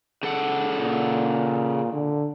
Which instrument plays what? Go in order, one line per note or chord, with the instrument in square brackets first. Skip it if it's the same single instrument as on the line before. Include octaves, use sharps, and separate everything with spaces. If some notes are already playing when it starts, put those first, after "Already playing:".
[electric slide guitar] C#3 A4 F#5
[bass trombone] A#2
D3